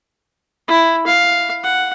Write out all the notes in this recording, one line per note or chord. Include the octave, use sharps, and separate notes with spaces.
E4
F5
F#5